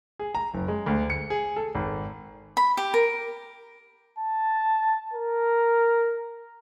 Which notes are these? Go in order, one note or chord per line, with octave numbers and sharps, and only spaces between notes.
G#4
A#5
F#1
G#3
D2
C#7
G#4
A4
G#1
B5
G4
A#4
A5
A#4